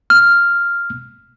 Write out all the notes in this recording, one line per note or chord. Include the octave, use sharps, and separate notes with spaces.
F6